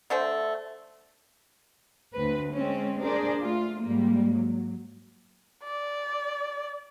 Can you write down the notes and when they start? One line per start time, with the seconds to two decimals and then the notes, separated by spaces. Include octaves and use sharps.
0.10 D3 A3 C5
2.13 D2 C4 B4
2.53 G#3 C4 C#4
3.01 D4 G#4 A#4 C5 D5
3.40 A3 F4
3.81 G#2 G3 A#3
4.31 F#3
5.64 D5